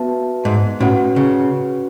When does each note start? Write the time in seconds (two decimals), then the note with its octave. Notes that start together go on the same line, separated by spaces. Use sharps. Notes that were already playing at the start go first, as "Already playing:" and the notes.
Already playing: B3 F#4 B4 E5 A5
0.45 G#2
0.80 A2 C#4 F#4 B4 F#5
1.16 C#3